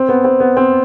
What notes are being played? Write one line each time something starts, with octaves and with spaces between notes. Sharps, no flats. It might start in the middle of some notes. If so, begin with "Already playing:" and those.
Already playing: C4
B3
C4
B3
C4